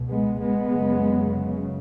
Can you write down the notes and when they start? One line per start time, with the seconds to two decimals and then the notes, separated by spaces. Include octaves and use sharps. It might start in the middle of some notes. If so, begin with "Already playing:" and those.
Already playing: C#2 B2
0.09 G#3 B3
0.41 G#3 B3
0.72 F#2 C#3